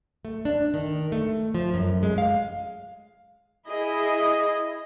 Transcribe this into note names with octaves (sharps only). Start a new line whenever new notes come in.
A3
D4
D#3
A3
F3
F#2
G#3
F5
E4 G#4 D#5